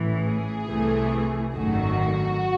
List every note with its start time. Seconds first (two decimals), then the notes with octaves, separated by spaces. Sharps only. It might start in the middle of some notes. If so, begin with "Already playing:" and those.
Already playing: A1 A2 E3
0.21 G#4
0.66 C2 C3 E3 A3
1.55 G#1 F#2 D#3 A3 F#4